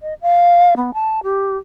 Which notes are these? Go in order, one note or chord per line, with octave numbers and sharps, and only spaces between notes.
D#5
F5
B3
A5
G4